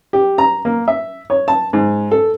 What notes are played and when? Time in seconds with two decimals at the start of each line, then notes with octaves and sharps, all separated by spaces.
0.13 G4
0.38 A#5
0.65 A#3
0.88 E5
1.30 C#5
1.48 A5
1.73 G#2
2.11 A4